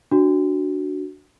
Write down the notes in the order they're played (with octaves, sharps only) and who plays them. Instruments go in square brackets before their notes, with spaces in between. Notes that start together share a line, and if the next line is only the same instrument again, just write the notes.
[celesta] D4 F#4